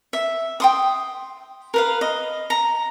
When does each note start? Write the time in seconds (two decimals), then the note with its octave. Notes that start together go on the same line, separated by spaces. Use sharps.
0.13 E5
0.60 G5 C6 D#6
1.74 A#4 B4 F5
2.01 D#5
2.50 A#5